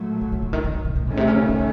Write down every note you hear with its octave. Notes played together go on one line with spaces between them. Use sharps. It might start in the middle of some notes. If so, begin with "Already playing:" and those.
Already playing: A#2 F#3 A3
C#3
C#3
C#3
D#3
D#3
C3
A#2
A2 D#3 A3 C#4
C3
C#3
C#3